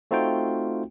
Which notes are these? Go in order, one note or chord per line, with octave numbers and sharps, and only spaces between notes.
A3 C4 D#4 F4 F#4 G5